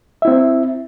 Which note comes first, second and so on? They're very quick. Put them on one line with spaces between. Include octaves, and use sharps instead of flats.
E5 E4 C4